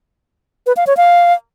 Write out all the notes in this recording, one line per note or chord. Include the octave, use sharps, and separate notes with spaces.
B4
F5
C#5
F5